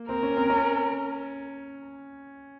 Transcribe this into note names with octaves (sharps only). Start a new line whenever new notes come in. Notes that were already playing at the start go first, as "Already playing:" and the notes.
Already playing: A#3
C4 A#4
C#4
C4
C#4